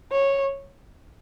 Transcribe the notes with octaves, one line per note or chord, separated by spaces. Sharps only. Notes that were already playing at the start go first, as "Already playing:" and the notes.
C#5